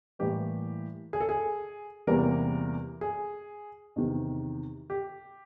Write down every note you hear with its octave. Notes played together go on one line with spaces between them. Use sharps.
A2 E3 G3 A#3 G4
G#4
A4
G#4
E2 C3 E3 G3 A#3 A#4
G#4
E2 C3 D#3
G4